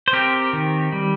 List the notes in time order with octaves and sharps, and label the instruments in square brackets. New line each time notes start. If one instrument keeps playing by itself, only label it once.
[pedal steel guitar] C5
C4 G4 A#4
D#3
G3